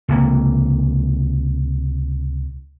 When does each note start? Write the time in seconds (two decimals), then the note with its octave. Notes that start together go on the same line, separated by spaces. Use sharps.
0.08 C#2 C3 A#3